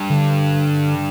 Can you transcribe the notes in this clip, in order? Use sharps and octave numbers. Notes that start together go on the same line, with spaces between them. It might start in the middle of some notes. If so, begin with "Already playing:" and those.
Already playing: G2
D3